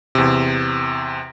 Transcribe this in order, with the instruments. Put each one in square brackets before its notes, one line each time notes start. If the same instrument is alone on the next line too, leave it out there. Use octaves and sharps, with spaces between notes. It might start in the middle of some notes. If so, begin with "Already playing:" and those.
[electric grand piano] E2 C3